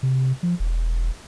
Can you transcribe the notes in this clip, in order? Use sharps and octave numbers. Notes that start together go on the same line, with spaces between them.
C3
F3
E1